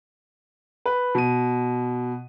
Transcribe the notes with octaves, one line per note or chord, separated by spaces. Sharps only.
B4
B2 D#7